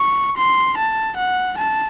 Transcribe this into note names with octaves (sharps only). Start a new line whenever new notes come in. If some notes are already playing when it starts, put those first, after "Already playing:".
Already playing: C#6
C6
A5
F#5
A5